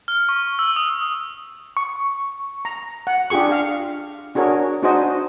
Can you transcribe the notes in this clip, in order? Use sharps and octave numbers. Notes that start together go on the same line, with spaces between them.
F6
C#6
E6
D#6
C#6
A#5
F#5
D4 F4 G4 G#4 C#6
F5
D4 F#4 G#4 A#4 C#5
D4 D#4 F#4 G#4 C5 D#5